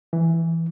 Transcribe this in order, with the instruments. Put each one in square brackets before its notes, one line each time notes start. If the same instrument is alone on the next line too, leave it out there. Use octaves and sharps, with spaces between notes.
[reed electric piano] E3